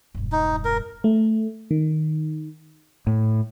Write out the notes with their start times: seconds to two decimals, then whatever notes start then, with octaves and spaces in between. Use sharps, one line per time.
0.15 E1 G2
0.32 D#4
0.65 A#4
1.04 A3
1.71 D#3
3.07 A2